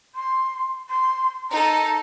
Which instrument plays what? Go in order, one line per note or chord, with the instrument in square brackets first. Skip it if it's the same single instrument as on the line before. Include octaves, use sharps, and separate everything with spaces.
[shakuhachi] C6
C6
[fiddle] D#4 A4 [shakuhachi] A#5